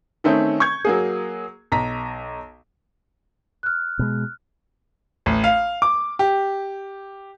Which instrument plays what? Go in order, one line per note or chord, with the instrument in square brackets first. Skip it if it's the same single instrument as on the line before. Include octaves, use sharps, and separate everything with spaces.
[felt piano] D#3 A3 C4 C#4 D#4
C#6 G6 G#6
F#3 A#3 G#4
B1 A#5 B6
[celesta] F6 F#6
[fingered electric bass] B2 G#3
[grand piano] A1
F5
D6
G4